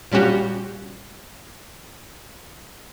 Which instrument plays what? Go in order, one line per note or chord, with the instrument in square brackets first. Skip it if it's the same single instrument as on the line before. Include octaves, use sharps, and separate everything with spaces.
[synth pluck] A#2 G3 C#4 F#4 G4